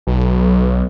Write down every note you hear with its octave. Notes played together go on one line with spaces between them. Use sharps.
B1